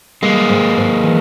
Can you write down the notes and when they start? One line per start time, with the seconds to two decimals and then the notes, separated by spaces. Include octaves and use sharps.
0.22 G3 G#3 A#3
0.49 G#2
0.77 G#2
1.03 E3